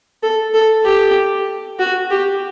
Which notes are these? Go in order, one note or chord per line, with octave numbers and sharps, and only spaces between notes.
A4
A4
G4
F#4
G4